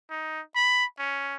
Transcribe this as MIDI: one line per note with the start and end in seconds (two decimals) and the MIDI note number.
0.10 0.41 63
0.55 0.85 83
0.99 1.36 61